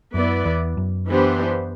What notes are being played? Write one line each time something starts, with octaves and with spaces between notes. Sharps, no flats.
F#2 B3 E4 B4 D5
E2
F#2
E3 B3 D4 G4 C5